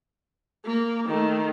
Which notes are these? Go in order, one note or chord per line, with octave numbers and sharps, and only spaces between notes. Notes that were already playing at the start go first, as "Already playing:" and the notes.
A#3
D#3 A3